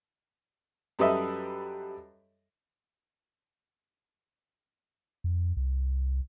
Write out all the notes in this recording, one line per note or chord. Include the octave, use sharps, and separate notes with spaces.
F#2 G3 A4 B4 D#5 E5
F2
C2